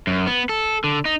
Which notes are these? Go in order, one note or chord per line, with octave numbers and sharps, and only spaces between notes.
F#2
B3
A4
D3
D#4